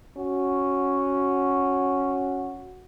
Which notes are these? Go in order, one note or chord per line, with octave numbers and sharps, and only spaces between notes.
C#4 F#4